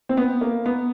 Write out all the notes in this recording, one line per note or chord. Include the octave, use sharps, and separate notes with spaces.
C4
B3
A#3
B3